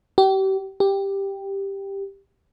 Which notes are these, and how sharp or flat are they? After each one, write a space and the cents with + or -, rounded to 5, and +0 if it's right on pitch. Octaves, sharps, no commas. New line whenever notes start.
G4 -35
G4 +5